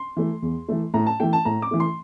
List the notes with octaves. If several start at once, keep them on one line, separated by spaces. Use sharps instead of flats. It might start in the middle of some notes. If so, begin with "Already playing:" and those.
Already playing: C6
E3 A3
E2
E3 A3
A2 A#5
A5
E3 A3 G5
A5
A2 A#5
D6
E3 A3
C6